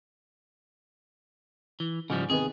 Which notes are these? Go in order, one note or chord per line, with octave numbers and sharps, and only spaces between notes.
E3
G#2 C#3 F3 G3
C3 D#3 B3 G#4